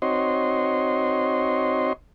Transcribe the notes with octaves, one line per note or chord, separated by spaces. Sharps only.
C4 D#4 F#4 C#5 D#5 C6